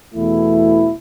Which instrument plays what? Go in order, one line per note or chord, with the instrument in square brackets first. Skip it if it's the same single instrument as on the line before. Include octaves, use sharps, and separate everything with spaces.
[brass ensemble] E2 B2 A3 E4